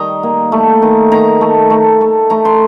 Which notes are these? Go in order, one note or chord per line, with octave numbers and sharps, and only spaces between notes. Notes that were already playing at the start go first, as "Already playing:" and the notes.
Already playing: D#3 G3 D#5 G5 A#5
A#3
A3
D#3
D#3 A#5
A3
A3
A3
A3 A#5
C6